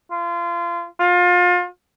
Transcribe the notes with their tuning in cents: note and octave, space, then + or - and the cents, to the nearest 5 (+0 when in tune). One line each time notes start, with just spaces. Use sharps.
F4 -30
F4 +30